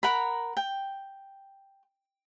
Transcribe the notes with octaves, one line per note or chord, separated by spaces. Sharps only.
A#4 F#5 A#5 B5
G5